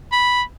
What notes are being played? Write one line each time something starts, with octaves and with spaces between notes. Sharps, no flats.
B5